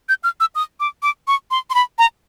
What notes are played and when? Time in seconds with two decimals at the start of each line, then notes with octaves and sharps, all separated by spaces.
0.09 G6
0.24 F6
0.40 E6
0.55 D#6
0.80 D6
1.03 D6
1.27 C#6
1.51 C6
1.70 C6
1.75 B5
1.99 A#5